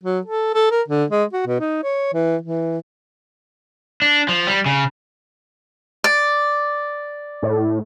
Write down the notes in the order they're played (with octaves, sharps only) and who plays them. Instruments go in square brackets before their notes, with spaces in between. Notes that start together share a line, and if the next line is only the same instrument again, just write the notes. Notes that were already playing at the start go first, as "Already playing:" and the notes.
[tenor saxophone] F#3
A4
A4
A#4
D3
G#3
F#4
B2
D#4
C#5
E3
E3
[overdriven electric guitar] D4
F3
G3
C#3
[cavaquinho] D5
[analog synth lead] A2